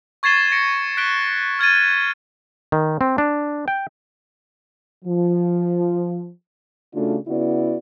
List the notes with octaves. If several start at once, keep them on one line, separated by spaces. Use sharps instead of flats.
C#6 G#6 A6 C7 E7 G7
A#6 C#7 D7
F#6 B6 D7 G7
F6 G#6 A6 D#7
D#3
C4
D4
G5
F3
C#3 A3 D4 F4 F#4
C#3 B3 E4 F#4 D5